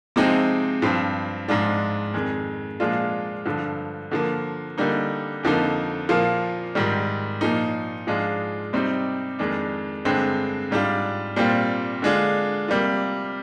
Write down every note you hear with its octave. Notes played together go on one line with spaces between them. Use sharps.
C3 F3 G#3 C4 D#4
G2 F3 C4
G#2 F3 G#3 D4 F4
F2 D#3 G#3
A#2 F3 G#3 D4 F4
G2 D3 F3
D3 F3 A#3
D3 G3 A#3 D#4
F2 D3 F3 A#3 D#4
A#2 F3 A#3 F4
G#2 D#3 G3
A#2 F3 A#3 D#4
G#2 F3 G#3 D4 F4
C3 G3 C4 D#4
F2 D#3 G#3 D4
G2 D3 G#3 C4
G#2 G3 D4 F4
A#2 G3 C4 F4
D3 G#3 D4 F4
C3 G3 A#3 F4